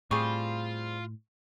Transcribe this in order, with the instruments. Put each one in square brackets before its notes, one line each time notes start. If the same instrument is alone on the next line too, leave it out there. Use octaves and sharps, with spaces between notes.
[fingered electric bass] A2 [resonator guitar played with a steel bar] G3 C4 G#4 [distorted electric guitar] F4 [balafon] C#6